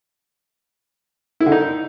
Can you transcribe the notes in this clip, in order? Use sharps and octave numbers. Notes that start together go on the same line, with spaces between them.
E4
D3
D#4